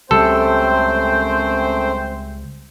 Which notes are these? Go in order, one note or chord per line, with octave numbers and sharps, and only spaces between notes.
C#2 F#2 G3 A3 C4 A4 C5 G5